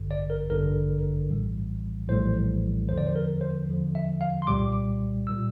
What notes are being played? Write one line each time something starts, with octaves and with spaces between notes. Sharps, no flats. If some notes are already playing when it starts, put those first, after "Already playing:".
Already playing: A1 G2 D3
D5
A#4
A1 G2 D3 A#4
A#1 A2 E3 G3
A#1 A2 E3 G3 C5
E2 D3 F3 C5
D5
C5
A#4
C5
E2 D3 F3
E5
F5
C6
C2 A#2 G3 D6
A#2 G3 E6